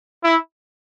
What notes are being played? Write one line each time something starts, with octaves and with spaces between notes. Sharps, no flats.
E4